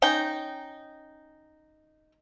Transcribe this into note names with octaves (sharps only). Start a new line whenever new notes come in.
C#4 D#4 G5